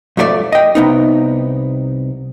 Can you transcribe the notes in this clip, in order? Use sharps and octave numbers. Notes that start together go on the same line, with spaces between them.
F2 G#2 A3 G#4 D5 E5
D#5 G5
C2 B3 D#4